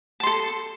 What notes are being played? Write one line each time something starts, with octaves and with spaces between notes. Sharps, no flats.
A4 A5 C6